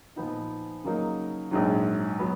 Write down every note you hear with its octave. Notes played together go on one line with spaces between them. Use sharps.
A#2 F3 B3 D#4
C#3 F#3 A#3 D#4
A#1 G#2 F#3
F#3 B3